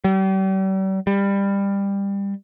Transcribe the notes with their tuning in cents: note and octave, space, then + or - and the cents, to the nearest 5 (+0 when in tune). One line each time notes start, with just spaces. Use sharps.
G3 -40
G3 +20